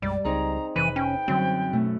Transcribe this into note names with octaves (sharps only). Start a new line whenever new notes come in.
B1 F#2 G3 G#3 D5
C#2 C4 D#4 G#4 A#5
F1 C3 E3 B4 D#7
C#4 G5
F#2 D3 G3 C4
B2 A3